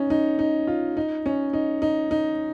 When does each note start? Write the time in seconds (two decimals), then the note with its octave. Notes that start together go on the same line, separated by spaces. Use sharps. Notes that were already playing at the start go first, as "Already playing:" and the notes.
Already playing: C#4 D#4
0.10 D#4
0.39 D#4
0.67 F4
0.97 D#4
1.26 C#4
1.53 D#4
1.82 D#4
2.11 D#4